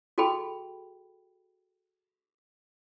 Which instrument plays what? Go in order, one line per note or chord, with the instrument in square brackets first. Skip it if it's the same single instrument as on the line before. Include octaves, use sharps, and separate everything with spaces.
[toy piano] F#4 G#4 A4 G5 B5